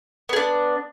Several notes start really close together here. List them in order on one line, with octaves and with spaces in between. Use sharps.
B3 G#4 D4